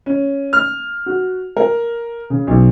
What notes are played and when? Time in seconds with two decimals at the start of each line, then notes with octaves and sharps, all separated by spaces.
0.06 C#4
0.53 F6
1.06 F#4
1.57 A#4
2.30 C#3
2.47 B1